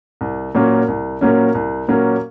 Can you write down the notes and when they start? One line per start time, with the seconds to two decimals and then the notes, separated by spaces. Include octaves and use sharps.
0.21 C2
0.55 A#2 F#3 A#3 C#4
0.88 C2
1.21 A#2 F#3 A#3 C#4
1.55 C2
1.88 A#2 F#3 A#3 C#4